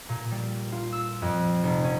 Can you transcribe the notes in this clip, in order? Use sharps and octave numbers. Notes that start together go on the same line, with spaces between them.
A#2
G3
F4
E6
F2
F1
C#4